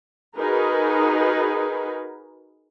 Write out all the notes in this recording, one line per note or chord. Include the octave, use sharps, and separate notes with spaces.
D#4 F#4 G#4 A#4 B4